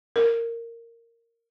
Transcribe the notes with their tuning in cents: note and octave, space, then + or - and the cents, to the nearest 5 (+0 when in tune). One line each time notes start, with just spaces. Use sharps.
A#4 -15